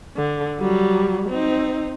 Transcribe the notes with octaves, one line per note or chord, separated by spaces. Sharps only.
D3
F#3 G3
C4 D#4